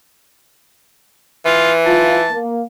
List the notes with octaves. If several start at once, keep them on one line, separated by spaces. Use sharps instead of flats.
E3 F4
D#4 F4 A5
A#3